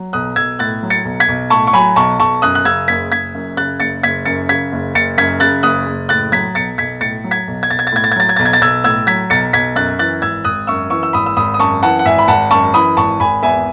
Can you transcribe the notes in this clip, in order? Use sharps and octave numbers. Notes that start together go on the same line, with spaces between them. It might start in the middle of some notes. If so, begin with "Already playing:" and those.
Already playing: F#3
B1 D#6 F#6
B1 E6 G#6
A2 F#6 A6
F#3
A6 C#7
B1
G#6 B6
B1
A2 A5 C#6
C#6
F#3 G#5 B5
B1 A5 C#6
B1 A5 C#6
F#2 D#6 F#6
F#6
C#3 E6 G#6
F#1 G#6 B6
F#1 G#6 B6
F#2
C#3 F#6 A6
F#1 A6 C#7
F#1 G#6 B6
F#2 A6 C#7
C#3 G#6 B6
F#1
F#1 A6 C#7
F#2 G#6 B6
C#3 F#6 A6
F#1 D#6 F#6
F#1
A2 F#6 A6
F#3 G#6 B6
B1 A6 C#7
B1 G#6 B6
A2 A6 C#7
F#3
G#6 B6
B1
G#6
B1 A6
G#6
A6
A2 G#6
A6
G#6
F#3 A6
G#6
B1 A6
G#6
A6
B1 E6 G#6
A2 E6 G#6
F#3 G#6 B6
B1 A6 C#7
B1 G#6 B6
F#2 F#6 A6
E3 F#6 A6
G#1 E6 G#6
G#1 D#6 F#6
F#2 C#6 E6
E3 C#6 E6
E6
G#1 B5 D#6
E6
G#1 B5 D#6
D#6
F#2 A5 C#6
E3 F#5 A5
F#5
G#1 E5 G#5
B5
G#1 F#5 A5
F#2 A5 C#6
E3 B5 D#6
G#1 A5 C#6
G#1 G#5 B5
E2 E5 G#5